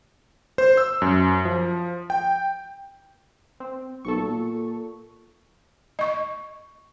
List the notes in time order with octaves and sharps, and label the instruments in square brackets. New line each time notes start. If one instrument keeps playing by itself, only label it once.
[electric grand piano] C5
E6
F#2
F3
G5
[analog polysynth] C4
[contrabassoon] B1 [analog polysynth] A4 C#6
[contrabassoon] A#2
[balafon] D#5 C#6